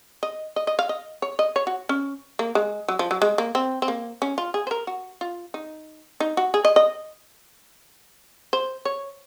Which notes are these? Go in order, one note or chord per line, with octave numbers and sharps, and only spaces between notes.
D#5
D#5
D#5
F5
D#5
C#5
D#5
C#5
F#4
C#4
A#3
G#3
F#3
F3
F#3
G#3
A#3
C4
C4
A#3
C#4
F4
G#4
C5
A#4
F#4
F4
D#4
D#4
F#4
G#4
D#5
D#5
C5
C#5